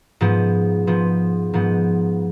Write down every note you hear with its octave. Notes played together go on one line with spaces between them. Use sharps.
G#2 F3 B3
G#2 F3 B3
G#2 F3 B3